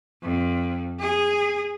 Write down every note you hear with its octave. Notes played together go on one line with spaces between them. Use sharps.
F2
G#4